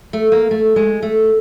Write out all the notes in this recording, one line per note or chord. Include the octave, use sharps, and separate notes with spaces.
A3
A#3
A3
G#3
A3